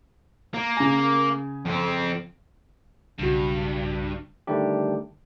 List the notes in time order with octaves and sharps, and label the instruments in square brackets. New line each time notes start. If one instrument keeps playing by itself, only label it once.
[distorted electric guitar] A#3
[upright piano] C#3 G#5
[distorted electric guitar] F2 C4
[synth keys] B1 C#3 F#4 [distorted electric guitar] G2
[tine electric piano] D3 D#3 G3 A3 D4 G4